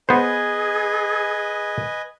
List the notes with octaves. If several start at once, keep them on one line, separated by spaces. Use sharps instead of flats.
B3 G#4 B4 C5 D#5 G#5